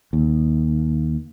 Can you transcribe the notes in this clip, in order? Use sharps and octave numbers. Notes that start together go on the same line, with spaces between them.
D#2